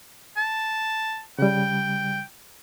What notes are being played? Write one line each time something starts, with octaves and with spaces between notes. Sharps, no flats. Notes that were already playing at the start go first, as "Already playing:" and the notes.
A5
C#3 G3 G5